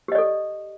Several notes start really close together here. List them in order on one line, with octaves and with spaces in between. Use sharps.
G4 D#5 D5 A4